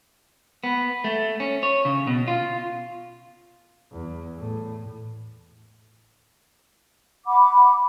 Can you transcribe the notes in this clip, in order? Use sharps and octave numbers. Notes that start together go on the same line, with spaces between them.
B3
A3
C#4
C#5
C#3
B2
F4
E2
A2
F#5 B5 D6